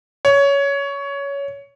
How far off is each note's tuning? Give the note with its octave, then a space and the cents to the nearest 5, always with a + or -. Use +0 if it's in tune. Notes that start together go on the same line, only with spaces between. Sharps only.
C#5 +15